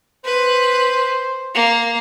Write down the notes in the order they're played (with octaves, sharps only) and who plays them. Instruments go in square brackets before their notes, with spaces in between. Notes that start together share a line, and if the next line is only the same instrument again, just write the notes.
[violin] B4 [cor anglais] C5
[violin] A#3